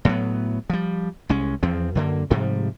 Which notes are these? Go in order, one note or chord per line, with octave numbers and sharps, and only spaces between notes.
A2 F#3 B3
F3 G3
C2 G#3 C#4
E2 F3 C4
F#2 D3 A#3
G#2 C3 F3 G3